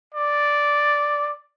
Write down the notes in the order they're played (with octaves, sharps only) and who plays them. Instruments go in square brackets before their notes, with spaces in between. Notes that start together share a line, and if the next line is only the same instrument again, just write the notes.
[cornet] D5